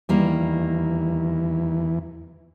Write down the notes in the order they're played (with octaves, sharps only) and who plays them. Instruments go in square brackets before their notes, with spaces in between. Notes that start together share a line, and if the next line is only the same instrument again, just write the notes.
[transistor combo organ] E2 E3 [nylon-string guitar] D#3 G3 A#3